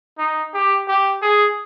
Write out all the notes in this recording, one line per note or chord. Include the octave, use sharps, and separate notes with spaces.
D#4
G4
G4
G#4